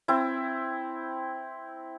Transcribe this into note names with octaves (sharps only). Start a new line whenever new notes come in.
C4 E4